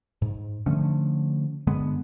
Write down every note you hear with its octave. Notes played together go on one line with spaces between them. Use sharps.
G#2
D3 F3 A3 C#4
G2 D3 G#3 B3